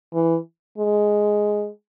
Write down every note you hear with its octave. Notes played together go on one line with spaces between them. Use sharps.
E3
G#3